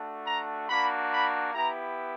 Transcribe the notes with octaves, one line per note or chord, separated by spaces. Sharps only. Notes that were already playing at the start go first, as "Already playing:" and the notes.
Already playing: A3 D4 F#4
A#5
A#3 D4 F#4 B5
B5
B3 E4 G4 A#5